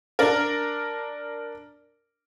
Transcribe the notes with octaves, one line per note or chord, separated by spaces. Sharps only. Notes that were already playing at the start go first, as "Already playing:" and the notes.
D4 A#4